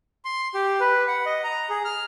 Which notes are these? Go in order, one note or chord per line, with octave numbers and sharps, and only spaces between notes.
C6
G4
B4
F#5
D#5
A#5
G#4
F6